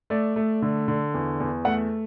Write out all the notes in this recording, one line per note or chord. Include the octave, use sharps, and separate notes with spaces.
A3 D5
A3
D3
D3
E2
E2
A3 F#5